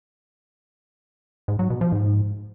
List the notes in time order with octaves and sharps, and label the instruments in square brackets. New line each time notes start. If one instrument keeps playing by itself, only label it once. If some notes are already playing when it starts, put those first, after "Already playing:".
[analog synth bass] G#2
F#3
B2
F3
G#2